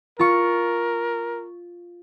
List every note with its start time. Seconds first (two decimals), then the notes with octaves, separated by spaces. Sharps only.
0.19 F4 A#4 C#6